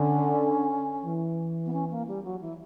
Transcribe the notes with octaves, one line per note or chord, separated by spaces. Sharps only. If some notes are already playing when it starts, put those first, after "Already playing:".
Already playing: D3 C#4
E3
B3
C#4
A#3
G3
F#3
E3